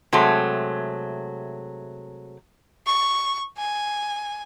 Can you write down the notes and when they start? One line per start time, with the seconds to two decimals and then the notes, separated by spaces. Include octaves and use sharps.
0.13 C3 F#3 G#3 A3
2.86 C#6
3.58 G#5